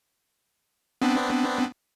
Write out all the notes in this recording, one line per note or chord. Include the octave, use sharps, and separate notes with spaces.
B3 C4 D4